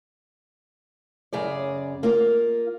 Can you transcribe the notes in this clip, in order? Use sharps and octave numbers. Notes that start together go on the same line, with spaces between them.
F#2 C#3 G#4 D5
A#3 F4